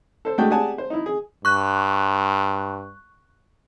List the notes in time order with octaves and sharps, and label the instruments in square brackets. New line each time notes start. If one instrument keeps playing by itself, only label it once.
[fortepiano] A4 C5
G#3 A3 D4 F#4 G#4 G5
G4 G#4 D5 F#5 G#5 A5
C5
D#4 E4
G#4
[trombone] G2 [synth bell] C#6 F#6